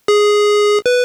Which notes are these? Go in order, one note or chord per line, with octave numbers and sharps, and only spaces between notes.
G#4
B4